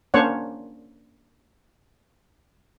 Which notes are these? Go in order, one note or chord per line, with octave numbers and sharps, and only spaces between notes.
A#3 C#4 D4 C5 C#5 F#5